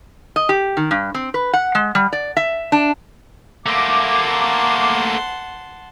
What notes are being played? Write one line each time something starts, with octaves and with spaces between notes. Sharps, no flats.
D#5
G4
D#3
G2
C4
B4
F#5
G#3
G3
D5
E5
D4
A3 A#3 F#5 A5 C6 D6